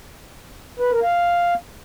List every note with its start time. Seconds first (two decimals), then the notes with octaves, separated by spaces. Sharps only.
0.80 B4
0.91 A#4
1.03 F5